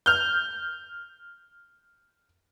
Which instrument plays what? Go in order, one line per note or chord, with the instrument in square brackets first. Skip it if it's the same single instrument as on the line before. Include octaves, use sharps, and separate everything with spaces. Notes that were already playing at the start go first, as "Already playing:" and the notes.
[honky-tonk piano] F6 G6